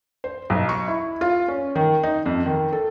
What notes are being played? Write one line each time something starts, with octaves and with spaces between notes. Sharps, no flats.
C5
B1
C#6
E4
F4
C#4
D#3
D#4
F2
D#3
A4